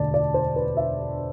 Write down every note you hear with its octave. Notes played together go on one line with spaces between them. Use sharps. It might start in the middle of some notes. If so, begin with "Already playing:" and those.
Already playing: E1 D2 D3 A3 D5 A5
D5
C5
B4
E5